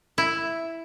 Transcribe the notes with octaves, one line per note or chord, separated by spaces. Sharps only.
E4